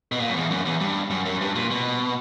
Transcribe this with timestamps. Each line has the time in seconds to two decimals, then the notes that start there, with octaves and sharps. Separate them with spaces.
0.12 B2
0.20 A#2
0.29 F#2
0.36 E2
0.51 F#2
0.65 E2
0.80 G2
1.10 F#2
1.26 F#2
1.41 G2
1.55 A#2
1.71 B2